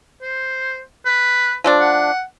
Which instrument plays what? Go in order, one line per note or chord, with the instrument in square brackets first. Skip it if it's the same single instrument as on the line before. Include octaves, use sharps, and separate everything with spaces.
[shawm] C5
B4
[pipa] F3 A3 D4
[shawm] F#5